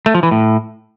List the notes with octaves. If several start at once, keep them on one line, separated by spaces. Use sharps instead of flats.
A3
F3
E3
A2